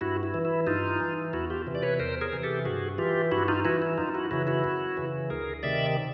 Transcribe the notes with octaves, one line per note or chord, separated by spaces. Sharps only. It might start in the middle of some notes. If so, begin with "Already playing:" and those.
G2 E4 F#4
E4
E3
E4
G2 D#4 F4
E3
E2 E4 F#4
F4 G4
C3 E3
D5
B4 C#5
E2 A#4 C5
G#4 A#4
C3 E3
G4 A4
G2 F#4 G#4
E3 F4 G4
G2 E4 F#4
D#4 F4
E3 E4 F#4
E4
F#2 D#4 F4
E4 F#4
C#3 E3 E4 F#4
E4 F#4
F#2
C#3 E3
D2 G#4 A#4
C3 D#3 D5 E5